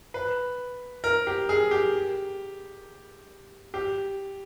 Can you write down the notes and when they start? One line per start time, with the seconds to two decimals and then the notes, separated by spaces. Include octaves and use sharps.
0.14 B4
1.04 A#4
1.27 G4
1.49 G#4
1.71 G4
3.74 G4